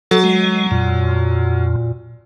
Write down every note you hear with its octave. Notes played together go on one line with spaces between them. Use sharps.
F#3 A4
G#3
F2 A#2